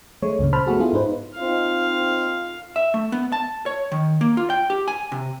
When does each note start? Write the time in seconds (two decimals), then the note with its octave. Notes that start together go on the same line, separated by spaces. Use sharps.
0.22 G#3 A3 C#5
0.39 C#2 G2 A#2 C#3
0.53 C5 A5 B5 F6
0.67 A3 B3 F#4 G#4
0.79 G#3 B3 E4 F4 G#4 A4
0.93 G#2 D#4 B4 C5
1.38 C4 D#4 F4 F5
2.76 E5
2.94 A3
3.12 B3
3.32 A5
3.66 C#5
3.92 D#3
4.21 A#3
4.37 F4
4.50 G5
4.70 G4
4.88 G#5
5.12 C3